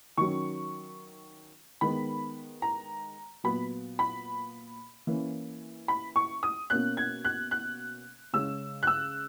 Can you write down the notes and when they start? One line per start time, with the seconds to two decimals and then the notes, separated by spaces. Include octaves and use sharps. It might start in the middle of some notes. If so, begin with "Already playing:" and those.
0.17 D#3 F#3 C#4 C#6
1.81 D#3 G#3 B3 B5
2.62 A#5
3.44 A#2 F#3 B3 B5
3.99 B5
5.07 E3 A#3 C#4
5.88 B5
6.16 C#6
6.43 D#6
6.70 B2 A#3 C#4 F#6
6.97 G#6
7.25 F#6
7.51 F#6
8.33 C#3 G#3 C#4 E6
8.83 F#6
8.87 E6